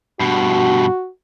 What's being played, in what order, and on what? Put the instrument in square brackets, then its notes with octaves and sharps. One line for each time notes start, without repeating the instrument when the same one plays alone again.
[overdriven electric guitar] G2 B2 [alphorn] F#4